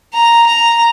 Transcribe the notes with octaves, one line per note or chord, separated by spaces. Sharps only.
A#5
A#5